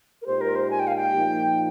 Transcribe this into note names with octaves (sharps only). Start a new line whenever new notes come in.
A#4
A#2 G#3 D#4 G4 C5
A#4
C5
G#5
G5
F5
G5
A#2 F3 A#3 D#4